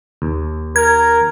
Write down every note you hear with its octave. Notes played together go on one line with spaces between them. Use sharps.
D#2
A#4 G#6